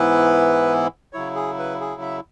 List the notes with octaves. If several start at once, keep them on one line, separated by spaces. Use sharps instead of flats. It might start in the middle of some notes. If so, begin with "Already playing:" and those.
Already playing: G#2 E3 B3 E4 B4
C#3 F#3 E4 C#5
G#4
B4
G#4
E5